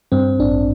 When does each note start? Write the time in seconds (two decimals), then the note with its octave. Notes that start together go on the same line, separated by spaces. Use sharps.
0.12 G2 C4
0.39 A1 D4